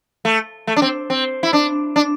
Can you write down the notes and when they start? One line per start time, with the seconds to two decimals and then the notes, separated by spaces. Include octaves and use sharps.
0.25 A3
0.67 A3
0.76 D4
0.82 C4
1.10 C4
1.43 E4
1.53 D4
1.96 D4